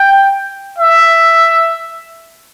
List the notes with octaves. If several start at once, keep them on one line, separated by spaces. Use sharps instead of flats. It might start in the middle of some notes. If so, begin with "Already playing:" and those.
Already playing: G5
E5